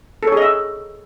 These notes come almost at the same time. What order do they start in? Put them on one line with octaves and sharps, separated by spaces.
A4 C#5 G#4 D#5 E5